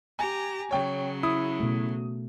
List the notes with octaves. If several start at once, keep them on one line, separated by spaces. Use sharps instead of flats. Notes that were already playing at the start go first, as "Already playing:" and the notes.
G4 G#5 A#5
C#3 F#3 C#5 G5
E4 D#6
B2 A3